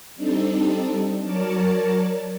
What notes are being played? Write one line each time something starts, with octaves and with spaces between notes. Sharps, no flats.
G3 C4 D4 D#4 A4
F#3 A#4 C#5 D5 A5